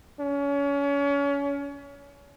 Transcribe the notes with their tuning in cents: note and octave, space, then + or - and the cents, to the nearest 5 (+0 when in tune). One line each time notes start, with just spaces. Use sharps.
C#4 +30